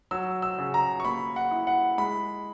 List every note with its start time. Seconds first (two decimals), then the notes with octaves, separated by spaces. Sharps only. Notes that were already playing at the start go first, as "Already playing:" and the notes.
0.11 F#3 E6
0.42 E6
0.58 C#3
0.74 A#5
1.00 C#6
1.05 A#3 B5
1.36 F#5
1.51 E4
1.67 F#5
1.98 G#3 B5